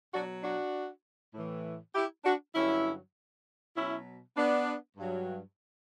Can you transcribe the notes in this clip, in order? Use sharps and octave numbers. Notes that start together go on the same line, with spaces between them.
B2 F#3 D4 F#4
D4 F#4
A2 E3
E4 G4
D4 F#4
G2 D3 F#3 C#4 E4
B2 F#3 C#4 E4
B3 D4
G2 F#3